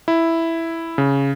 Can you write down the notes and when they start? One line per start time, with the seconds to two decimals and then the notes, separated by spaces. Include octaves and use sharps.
0.08 E4
0.98 C#3